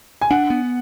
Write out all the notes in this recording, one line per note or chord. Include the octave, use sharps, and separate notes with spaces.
G#5
D4 F#5
B3